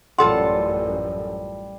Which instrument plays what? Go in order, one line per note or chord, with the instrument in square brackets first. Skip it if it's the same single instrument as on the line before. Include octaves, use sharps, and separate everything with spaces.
[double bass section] A1 F#2 A2 [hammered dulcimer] G3 [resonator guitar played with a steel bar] F4 A4 F#5 [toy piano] C6